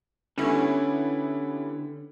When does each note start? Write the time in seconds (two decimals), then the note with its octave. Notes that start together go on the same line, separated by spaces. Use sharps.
0.38 D3 G3 B3 C#4 E4